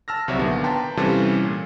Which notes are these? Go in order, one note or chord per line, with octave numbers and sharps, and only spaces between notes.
A5 E6 F6 A#6
C2 C3 F#3 F#4 C#5 E5
A#2 D3 D#3 B3
B4 G5 A5 A#5 C6
C3 E3 G3 C#4 F4 A4
A#2